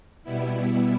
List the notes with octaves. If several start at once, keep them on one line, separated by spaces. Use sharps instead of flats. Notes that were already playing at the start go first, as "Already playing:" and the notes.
B2 G3 B3 E4